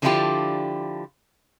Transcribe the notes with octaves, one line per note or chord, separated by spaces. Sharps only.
D3 F3 D4 E4 F4 G4